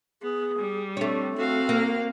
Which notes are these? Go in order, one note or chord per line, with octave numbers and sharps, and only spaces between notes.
B3 G#4
G3
A3 C4 D4 C#5
C4 F#4 A4 F5
A#3